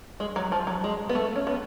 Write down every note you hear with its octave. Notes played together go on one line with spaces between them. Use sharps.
G#3
F#3
F3
F#3
G#3
B3
A3
C#4
B3